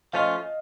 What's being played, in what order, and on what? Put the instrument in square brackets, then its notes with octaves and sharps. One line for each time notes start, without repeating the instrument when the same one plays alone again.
[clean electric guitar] F3 A3 C#4 F4 [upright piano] D#5 F5